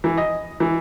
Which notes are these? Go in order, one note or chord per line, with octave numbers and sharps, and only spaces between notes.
E3
D#5
E3